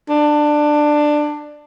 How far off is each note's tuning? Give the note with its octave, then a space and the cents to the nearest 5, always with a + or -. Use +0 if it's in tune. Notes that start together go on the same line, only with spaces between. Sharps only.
D4 +15